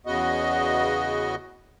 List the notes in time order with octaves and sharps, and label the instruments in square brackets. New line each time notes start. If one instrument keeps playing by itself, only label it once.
[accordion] E2 C#3 B3 F#4 D#5